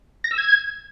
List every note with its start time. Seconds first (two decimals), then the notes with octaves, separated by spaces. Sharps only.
0.24 A#6
0.31 E6
0.38 G#6